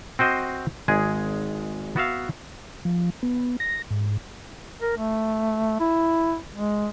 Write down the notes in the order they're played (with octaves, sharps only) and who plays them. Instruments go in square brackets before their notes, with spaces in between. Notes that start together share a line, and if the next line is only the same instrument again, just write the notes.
[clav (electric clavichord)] C4 F#4 C5 D#5
G#1 G#3 G#4
B3 F#4 E5 F5
[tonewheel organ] F3
B3
A#6
G#2
[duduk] A#4
A3
E4
G#3